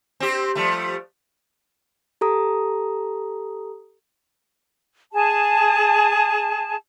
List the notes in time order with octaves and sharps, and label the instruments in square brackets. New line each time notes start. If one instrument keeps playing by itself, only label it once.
[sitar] C4 G4
F3 G3 A3
[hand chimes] G4 A4 A#5 D#6
[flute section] G#4 A5